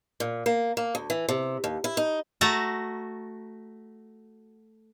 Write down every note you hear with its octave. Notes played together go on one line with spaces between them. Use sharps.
A#2
A#3
A#3
D2
E3
C3
D#2
E4
D#4
A3 F#4 A5 A#5